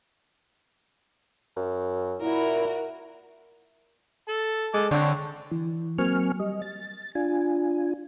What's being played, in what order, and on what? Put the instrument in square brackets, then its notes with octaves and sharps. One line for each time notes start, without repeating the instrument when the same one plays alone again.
[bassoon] F#2
[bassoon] A#2 [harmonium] E4 [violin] F#4 A#4
[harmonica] A4
[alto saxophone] G#3 [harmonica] A4 D6
[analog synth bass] D3 [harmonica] C4 C#5 [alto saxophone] D4
[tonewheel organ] E3
F#3 A#3 C4 G#5 C#6 F6
G3 D#5
A6
D4 F4 G#5